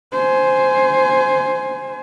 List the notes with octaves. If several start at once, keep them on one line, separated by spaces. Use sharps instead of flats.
C5 G#5